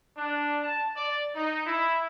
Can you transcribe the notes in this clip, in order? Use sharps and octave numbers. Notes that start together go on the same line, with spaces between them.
D4
A5
D5
D#4
E4